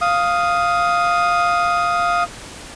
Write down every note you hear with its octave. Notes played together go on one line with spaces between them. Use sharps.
F5 D#6